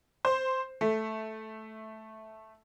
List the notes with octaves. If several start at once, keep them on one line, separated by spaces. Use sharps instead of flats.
C5
A3